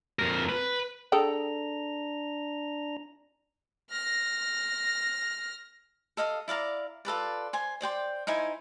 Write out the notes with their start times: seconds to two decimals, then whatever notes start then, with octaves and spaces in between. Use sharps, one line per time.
0.19 F2 A#4
0.49 B4
1.12 D4 G#4 A4 G5 A#5
3.90 F6 A#6
6.17 A4 D#5 F5 D#6
6.48 E4 D5 F5 A#5
7.05 F4 A4 B4 D5
7.53 C5 G#5 C6
7.81 C5 D5 G5 C6
8.27 D#4 E4 C5 G#5